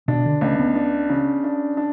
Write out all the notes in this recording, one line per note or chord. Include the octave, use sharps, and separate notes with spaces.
B2 D4
D3
C#2 A3
B3
D4
C#3
D4
D4